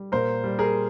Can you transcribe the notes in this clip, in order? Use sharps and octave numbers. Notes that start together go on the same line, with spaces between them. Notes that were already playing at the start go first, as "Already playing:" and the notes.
Already playing: G3
A#2 A#4 C5
G3
G#4 A#4